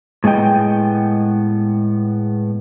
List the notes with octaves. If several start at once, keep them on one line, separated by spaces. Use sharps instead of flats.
A2 G#3 B3 D#5 G5